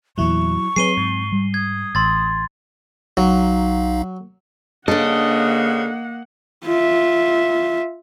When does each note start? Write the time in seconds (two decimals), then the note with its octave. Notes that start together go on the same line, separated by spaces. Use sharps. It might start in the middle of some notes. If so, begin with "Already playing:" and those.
0.18 E2 A#2 F#3 E4 C#6
0.76 F#3 C4 G#4 B4 C#5 C7 D#7 G7
0.97 G#2
1.32 G3
1.54 D#6 G#6
1.95 A1 C6 E6 A6
3.17 B1 F#3 D#4 F5
4.88 C#3 A#3 D4 A4 D#5 F#5
6.65 F4 E5